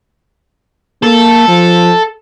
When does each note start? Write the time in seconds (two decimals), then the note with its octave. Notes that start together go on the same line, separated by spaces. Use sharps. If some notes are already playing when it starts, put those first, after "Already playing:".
1.03 A#3 A4
1.48 F3